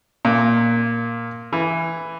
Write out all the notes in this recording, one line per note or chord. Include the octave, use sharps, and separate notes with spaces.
A#2 A#3
E3